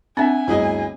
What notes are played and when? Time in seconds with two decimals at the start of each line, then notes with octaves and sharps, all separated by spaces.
0.17 C4 D4 E5 F#5 G#5
0.48 G1 D2 E4 G#4 D#5